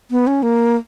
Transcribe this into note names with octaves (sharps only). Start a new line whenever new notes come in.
B3
C#4
A#3